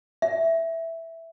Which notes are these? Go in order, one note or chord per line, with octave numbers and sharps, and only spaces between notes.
E5